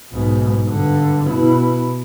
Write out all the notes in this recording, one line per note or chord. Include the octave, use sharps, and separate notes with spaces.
B1 G#2
G2 D3
B2 E4